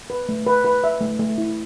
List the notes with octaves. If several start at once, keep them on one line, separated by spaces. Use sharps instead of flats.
B4
A3
B4
B4
E5
A3
A3
E4